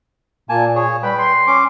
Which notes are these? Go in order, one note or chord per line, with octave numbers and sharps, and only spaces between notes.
A#2 A#3 G#5 A5
G#4 C#5
G3 B4 G5 B5
C6
C#4 D6